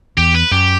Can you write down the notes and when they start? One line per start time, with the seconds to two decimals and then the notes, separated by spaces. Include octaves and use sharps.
0.18 E2 G4
0.34 B4
0.51 F#2 G4